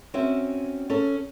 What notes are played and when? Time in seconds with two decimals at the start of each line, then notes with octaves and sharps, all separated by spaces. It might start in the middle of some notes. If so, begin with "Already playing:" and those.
0.14 C4 C#4 F#4 E5
0.90 C#4 A4